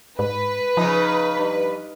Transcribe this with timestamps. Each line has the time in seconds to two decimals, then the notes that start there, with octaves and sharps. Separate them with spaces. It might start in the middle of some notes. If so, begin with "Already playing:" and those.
0.19 G#2 B4
0.77 C#3 F3 D#4
1.37 G2